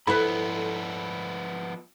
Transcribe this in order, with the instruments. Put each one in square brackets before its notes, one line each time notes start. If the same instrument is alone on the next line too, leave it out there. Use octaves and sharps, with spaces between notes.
[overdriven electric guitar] F3 B3 [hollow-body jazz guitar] E4 B5 [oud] A4 B4